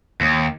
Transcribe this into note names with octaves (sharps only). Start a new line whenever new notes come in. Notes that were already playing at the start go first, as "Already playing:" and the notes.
D#2